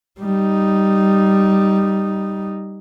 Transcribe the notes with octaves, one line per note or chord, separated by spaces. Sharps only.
G3 D#4